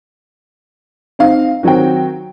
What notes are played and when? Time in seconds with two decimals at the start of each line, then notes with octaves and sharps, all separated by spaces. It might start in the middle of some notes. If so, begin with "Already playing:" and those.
1.19 C4 D#4 F5
1.63 D#3 F#3 C4 F#4 G5